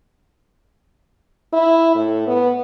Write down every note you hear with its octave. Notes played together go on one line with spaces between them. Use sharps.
E4
A2
B3